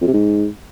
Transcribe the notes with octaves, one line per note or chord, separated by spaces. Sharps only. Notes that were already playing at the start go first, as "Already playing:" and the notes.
F2
C3
G#2